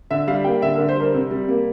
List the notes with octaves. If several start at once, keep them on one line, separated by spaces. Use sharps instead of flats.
D3 E5
G3 F5
A#3 G5
D3 E5
A#4
D3
C5
G3 A#4
C3
G3
A#3